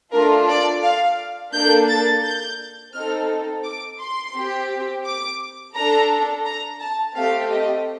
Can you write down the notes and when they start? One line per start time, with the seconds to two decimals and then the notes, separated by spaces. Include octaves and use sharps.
0.13 A3 D4 F4 A4 A#4
0.49 D5
0.83 F5
1.53 A#3 D4 A4 G6
1.89 A6
2.24 G6
2.94 C4 D#4 A4 F6
3.64 D6
3.99 C6
4.34 C4 G4
5.05 D6
5.74 D4 A4 A#5
6.45 A#5
6.80 A5
7.15 A3 C4 G4 F5
7.50 D#5